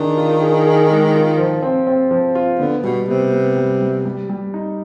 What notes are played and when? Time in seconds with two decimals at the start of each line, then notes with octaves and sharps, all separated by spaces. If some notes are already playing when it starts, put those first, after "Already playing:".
Already playing: D#3 D4 G#4
0.17 F4
0.42 G#4
0.66 G#4
0.90 G#3
1.14 F4
1.38 F3
1.63 C4
1.87 C4
2.11 F3
2.35 F4
2.59 D3 B3
2.84 B2 G3
3.08 C3 B3
3.32 B3
3.57 G3
3.81 G3
4.05 G3
4.29 G3
4.54 D#4